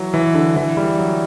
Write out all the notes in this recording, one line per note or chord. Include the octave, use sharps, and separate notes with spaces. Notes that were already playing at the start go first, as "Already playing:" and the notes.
Already playing: E3 F#3
E3
D3
E3
G3
F#3